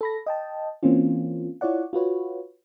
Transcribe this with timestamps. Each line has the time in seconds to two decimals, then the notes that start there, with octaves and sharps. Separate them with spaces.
0.01 A4 B5 A#6
0.26 D#5 G5 A5
0.83 E3 A#3 C4 C#4 F4
1.61 E4 F4 C#5 D5 F#5
1.93 F4 F#4 B4 C#5